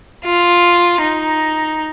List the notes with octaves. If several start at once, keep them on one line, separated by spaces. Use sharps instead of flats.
F4
D#4